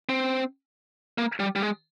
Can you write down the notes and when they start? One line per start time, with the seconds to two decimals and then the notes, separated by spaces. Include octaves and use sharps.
0.09 C4
1.18 A#3
1.40 G3
1.56 G3
1.62 G#3